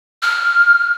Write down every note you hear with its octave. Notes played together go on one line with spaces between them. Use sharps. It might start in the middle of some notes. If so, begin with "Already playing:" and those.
F6